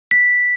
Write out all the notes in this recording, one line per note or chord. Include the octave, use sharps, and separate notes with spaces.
B6